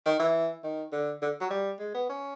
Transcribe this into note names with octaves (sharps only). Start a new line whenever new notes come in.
D#3
E3
D#3
D3
D3
F#3
G3
G#3
B3
C#4